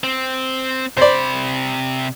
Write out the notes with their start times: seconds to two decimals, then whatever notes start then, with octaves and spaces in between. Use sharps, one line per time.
0.04 C4
0.97 C3 C5 D5 B5